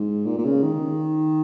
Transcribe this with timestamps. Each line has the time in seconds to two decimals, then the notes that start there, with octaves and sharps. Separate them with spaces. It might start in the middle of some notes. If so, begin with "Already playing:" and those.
Already playing: G#2
0.26 A#2
0.38 A#2
0.45 C#3
0.63 D#3